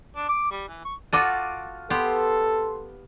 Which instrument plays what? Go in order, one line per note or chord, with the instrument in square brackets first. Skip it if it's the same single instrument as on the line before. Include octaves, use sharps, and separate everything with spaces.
[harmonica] D4
D6
G3
E3
C#6
[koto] F4 F#4 A4 [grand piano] D6 F6 D#7
[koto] B3 G4 [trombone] A4 [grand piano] C6